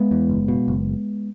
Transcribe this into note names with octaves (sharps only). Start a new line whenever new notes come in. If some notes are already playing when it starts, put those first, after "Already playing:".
Already playing: G#3 B3
E2
F#1
B2
F#1